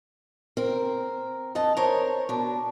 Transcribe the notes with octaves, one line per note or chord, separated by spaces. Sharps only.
C4 A#4
F2 D#5 A5
A#4 C5 C#5
B2 D4